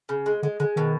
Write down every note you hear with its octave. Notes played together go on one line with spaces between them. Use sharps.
C#3
G#3
D3 G#3
D3 G#3
B2 D#3